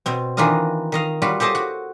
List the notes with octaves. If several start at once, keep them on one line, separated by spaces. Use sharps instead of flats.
B2 C4
D#3 E3 D4 F4 A#4 D#5
D#3 D#5 F5
G3 F4 F#4 B4
G4 A4 C5 D#5 A5
F#4